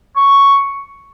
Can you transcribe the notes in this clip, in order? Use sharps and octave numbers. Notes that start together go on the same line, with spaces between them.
C#6